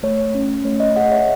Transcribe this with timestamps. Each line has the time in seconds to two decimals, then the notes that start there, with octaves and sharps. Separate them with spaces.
0.03 A3 C#5
0.35 C#4
0.64 A3 C#5
0.80 D#5
0.96 G#4 D#5 F#5
1.12 C#5 E5